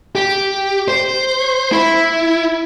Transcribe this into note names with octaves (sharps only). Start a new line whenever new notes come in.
G4
C5
E4